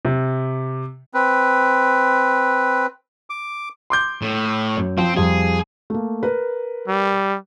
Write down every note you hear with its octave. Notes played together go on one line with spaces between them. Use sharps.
C3
C4 B4
D6
C6 D6 G6
A2
F#2
F3 C4
F2 F3 G3 G#4
A3 A#3
A#4 B4
G3